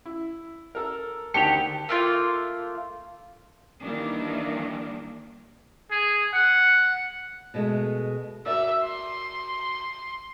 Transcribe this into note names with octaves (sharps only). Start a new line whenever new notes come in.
E4
A4 A#4
D2 D#3 G4 G5 A5 C#7 F7
A3 A#3 F4
D#3 E3 G3 A#3 D4
G#4
F#5
B2 G#3 A3
F#4 A#4 D5 E5
C6